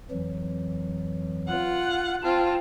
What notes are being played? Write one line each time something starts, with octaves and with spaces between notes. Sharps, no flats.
F2 E3 F#3
F4 F#5
C4 F4 A5